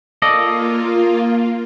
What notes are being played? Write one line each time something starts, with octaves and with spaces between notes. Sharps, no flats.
A#3 F4 A4 D5 D#5